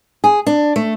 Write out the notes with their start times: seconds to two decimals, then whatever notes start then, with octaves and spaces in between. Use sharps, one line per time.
0.24 G#4
0.47 D4
0.76 A3